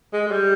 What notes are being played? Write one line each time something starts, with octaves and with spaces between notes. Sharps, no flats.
G#3
G#3
G3